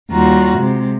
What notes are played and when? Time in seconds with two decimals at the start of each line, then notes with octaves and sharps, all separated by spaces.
0.11 D#2 G3 F4 F#4 A#5
0.56 C3 G#3